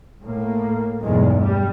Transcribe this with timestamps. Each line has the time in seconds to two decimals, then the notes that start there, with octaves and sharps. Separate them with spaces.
0.24 A2 A#3
1.02 B1 E2 G2 G#3
1.40 G3